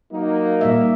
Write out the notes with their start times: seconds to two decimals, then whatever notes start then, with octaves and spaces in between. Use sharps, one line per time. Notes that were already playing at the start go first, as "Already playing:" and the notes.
0.12 F#3 A#3 D#4
0.61 A#2 G3 E5